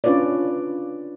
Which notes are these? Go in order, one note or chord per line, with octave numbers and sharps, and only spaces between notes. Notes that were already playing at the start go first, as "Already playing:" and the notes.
C#4 D4 F4 B4 C#5 D5